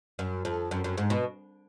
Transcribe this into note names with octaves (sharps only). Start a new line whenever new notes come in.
F#2
F2
F#2
F#2
G#2
B2